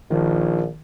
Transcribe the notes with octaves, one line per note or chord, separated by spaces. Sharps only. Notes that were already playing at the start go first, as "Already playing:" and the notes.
A#1 D#3 F3